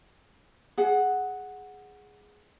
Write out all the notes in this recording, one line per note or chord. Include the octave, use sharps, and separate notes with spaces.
G#4 F#5